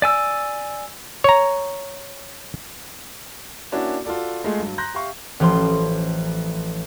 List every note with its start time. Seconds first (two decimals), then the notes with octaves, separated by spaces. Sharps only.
0.02 D5 G#5 E6
1.24 C#5 A#5
3.72 A#3 C#4 D4 E4 F#4
4.05 F4 F#4 A4 D5
4.44 G#3 A3 F4 G#4
4.59 G2 F#3
4.78 A#5 C6 F#6 G6 A#6
4.94 G4 E5 F5 C#6
5.40 A1 F3 C6